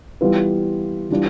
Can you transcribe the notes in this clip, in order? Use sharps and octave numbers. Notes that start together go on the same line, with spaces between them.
E3 G3 B3 F4 B4
E3 G3 D4 F4